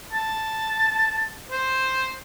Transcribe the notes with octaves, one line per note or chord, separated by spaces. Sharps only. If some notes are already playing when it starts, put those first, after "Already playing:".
A5
C5